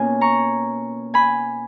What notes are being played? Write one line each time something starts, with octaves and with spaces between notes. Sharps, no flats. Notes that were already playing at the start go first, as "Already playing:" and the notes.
Already playing: B2 A#3 C#4 F4 G#5
A#5 C#6
G#5 B5